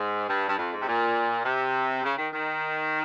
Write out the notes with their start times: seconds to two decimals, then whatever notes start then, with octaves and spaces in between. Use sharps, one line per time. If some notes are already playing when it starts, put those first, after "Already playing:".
Already playing: G#2
0.28 G2
0.48 G2
0.57 F2
0.72 G#2
0.80 C3
0.86 A#2
1.44 C3
2.03 C#3
2.17 D#3
2.32 D#3